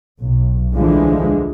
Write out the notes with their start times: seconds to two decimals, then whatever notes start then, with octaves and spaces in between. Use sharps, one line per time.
0.20 B1
0.75 D2 D3 E3 F3 G#3